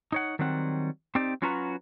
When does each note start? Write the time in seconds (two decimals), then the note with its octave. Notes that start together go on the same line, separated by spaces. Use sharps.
0.12 D#4 C#5 F#5
0.39 D#3 F#3 G3 C4 F#5
1.15 C4 D#4 G4 D5
1.42 F#3 C#4 F4 F#4 B4 A#5